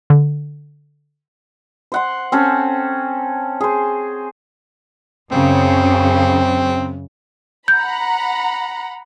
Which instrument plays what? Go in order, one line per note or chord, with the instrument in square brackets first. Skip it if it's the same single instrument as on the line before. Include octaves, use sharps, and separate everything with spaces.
[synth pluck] D3
[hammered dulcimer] C5 F#5 C6
C4 C#4 A4
G#4 C5
[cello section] F#2 C#3 [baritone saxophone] C4
[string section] F#5 A#5 B5 [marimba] G6